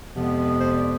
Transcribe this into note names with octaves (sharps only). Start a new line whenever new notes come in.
F2 C3 F3 G#3 B3
C5
D5